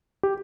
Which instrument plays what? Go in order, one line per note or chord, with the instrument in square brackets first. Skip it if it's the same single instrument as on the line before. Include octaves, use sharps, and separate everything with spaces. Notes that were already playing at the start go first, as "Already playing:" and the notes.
[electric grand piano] G4